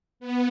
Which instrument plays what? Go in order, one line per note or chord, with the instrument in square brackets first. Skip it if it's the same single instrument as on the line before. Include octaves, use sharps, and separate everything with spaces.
[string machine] B3